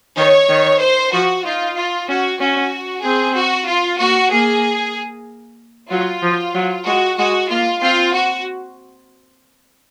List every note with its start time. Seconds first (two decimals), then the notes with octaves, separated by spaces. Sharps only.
0.18 D#3 C#5
0.49 D#3
0.81 C5
1.13 F3 F#4
1.45 D#4 F4
1.77 F4
2.09 C#4 F#4
2.40 C#4 F#4
3.04 C4 G#4
3.37 F#4
3.68 F4
4.00 A#3 F#4
4.31 A#3 G#4
5.91 F#3 F4
6.23 F3
6.55 F#3
6.86 G#3 F#4
7.18 G#3 F#4
7.50 A#3 F4
7.82 C4 F4
8.14 F#4